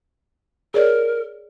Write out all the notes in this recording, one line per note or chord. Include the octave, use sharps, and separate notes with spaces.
G#4 A#4 C#5 D5